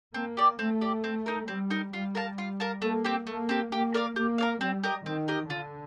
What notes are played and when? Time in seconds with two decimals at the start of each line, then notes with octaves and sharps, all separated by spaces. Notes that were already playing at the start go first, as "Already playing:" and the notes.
0.14 A#3 C4
0.37 G4 D5
0.59 A3 C4
0.81 G4 D5
1.04 C4
1.26 D#4 A#4
1.48 G3 C4
1.70 D#4 A#4
1.93 G3 F4
2.15 A#4 F5 A5
2.38 F4
2.60 A#4 F5 A5
2.82 A3 A#3
3.04 C4 G4
3.27 A3 A#3
3.49 C4 G4
3.71 A#3 G4
3.94 A#4 D5 F5
4.16 A#3 G4
4.38 A#4 D5 F5
4.60 G3 C4
4.84 G4 A#4 D#5
5.05 D#3 C4
5.28 G4 A#4 D#5
5.50 D3 F4